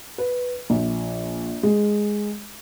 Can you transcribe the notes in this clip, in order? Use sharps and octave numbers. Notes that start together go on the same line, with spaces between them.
B4
A#1
G#3